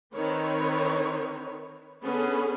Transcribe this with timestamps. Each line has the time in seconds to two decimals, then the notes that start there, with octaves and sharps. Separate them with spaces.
0.15 D#3 C4 B4 C#5
2.04 D3 B3 C#4 G#4 A4 B4